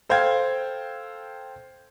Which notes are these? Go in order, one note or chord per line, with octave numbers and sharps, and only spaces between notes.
A4 C5 F5 G5 G#6